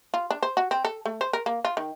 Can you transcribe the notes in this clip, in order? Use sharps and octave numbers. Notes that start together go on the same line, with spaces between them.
F4
D4
C5
F#4
C4
A4
A3
C5
A#4
A#3
F4
D#3